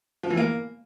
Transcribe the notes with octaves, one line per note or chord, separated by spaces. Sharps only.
F3
E3
A#3